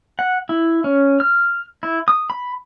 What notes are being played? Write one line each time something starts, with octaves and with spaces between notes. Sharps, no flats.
F#5
E4
C#4
F6
E4
D#6
B5